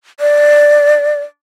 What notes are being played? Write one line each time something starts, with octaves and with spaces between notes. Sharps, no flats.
D5